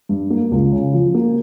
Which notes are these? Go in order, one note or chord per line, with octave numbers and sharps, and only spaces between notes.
G2
A#3
C#2
C#3
F3
A#3